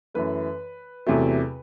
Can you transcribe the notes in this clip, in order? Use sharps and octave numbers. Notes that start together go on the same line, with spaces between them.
F#2 E3 A3 B4
E2 C3 F#3 A3